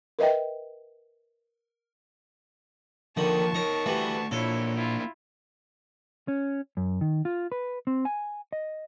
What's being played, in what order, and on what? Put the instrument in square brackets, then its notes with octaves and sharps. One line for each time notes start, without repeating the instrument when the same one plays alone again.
[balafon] A#4 B4 D#5 E5 G5
[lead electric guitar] D#2 [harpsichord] D3 D#3 [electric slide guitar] F3 [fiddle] A5 C#6
[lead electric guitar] D#4 C#5 [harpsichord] A#4
[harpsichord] E3 G3 [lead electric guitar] A3 F#4 [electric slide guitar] B4
[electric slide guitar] A#2 [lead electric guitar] A#3 D4 [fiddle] E4 C#5 [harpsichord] A4
[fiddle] E4 F4
[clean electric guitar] C#4
F#2
D#3
F4
B4
C4
G#5
D#5